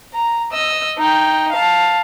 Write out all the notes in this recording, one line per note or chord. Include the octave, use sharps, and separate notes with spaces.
A#5
D#5 E6
D#4 G5
F5 A5